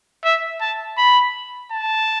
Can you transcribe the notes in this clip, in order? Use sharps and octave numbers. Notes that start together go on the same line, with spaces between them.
E5
A5
B5
A5